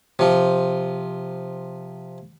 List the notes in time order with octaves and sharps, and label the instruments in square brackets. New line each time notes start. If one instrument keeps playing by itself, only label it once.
[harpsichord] C3 F3